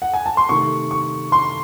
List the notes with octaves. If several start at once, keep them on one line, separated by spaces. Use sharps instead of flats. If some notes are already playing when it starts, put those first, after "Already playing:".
F#5
G#5
A5
C6
C3 D#3 A3 C#6
C#6
C6